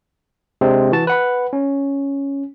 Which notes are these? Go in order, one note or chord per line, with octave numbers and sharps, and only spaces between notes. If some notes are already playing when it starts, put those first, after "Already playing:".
C3 G#3 C4 D4
E3 F#4 A5
B4 F#5 B5
C#4